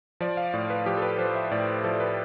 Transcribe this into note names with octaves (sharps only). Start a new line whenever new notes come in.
F3 D5
F5
A2 D5
B4
F3 G4
A4
B4
F3 C5
E5
A2 D5
F3 A4
B4